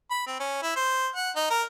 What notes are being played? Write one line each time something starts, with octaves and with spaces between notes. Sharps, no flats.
B5
C4
C#4
E4
C5
F#5
D#4
A#4